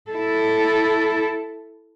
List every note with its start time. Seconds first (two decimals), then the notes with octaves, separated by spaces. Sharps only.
0.10 E4 A4